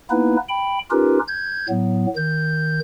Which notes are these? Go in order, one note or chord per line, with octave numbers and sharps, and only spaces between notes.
A#3 B3 D#4 E4 B4
G5 B5
C#4 D#4 F4 G4 A#4 B4
G6 G#6
A2 F#3 B3
D#3 G6